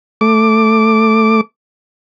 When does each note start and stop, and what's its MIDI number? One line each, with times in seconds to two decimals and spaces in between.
0.21 1.41 57
0.21 1.41 86